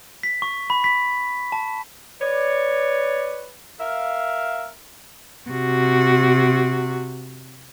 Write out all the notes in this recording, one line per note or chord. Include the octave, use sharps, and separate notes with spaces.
B6
C#6
B5
B6
A5
B4 C#5 D5
A#4 E5 F5
C3 F#4